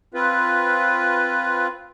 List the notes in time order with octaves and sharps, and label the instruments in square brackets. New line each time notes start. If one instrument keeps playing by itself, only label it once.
[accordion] C4 F4 B4